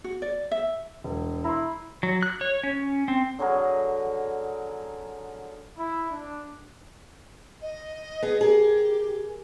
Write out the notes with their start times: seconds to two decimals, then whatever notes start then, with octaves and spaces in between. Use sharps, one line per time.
0.04 F#4
0.22 D5
0.51 E5
1.04 E1
1.44 E4 A#5 C6
2.03 F#3
2.23 F#6
2.41 C#5
2.63 C#4
3.08 C4
3.39 D3 F#3 G#4 A#4
5.77 E4
6.11 D4
7.62 D#5
8.22 B3 G#4
8.41 G4 G#4 A#4